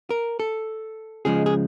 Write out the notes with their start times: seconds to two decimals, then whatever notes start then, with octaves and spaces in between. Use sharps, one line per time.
0.10 A#4
0.39 A4
1.25 C#2 C#3 F3 G#3 G#4
1.46 G#4